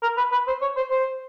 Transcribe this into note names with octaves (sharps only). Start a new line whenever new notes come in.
A#4
B4
B4
C5
C#5
C5
C5